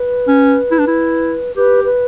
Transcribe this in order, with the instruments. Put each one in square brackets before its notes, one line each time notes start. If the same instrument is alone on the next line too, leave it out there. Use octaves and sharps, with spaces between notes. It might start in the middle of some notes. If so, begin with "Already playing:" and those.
Already playing: [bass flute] B4
[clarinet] C#4
E4
D4
E4
[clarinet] G4 [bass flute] B4
[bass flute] B4